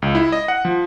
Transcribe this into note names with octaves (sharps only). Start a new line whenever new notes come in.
C#2
E4
D#5
F#5
F3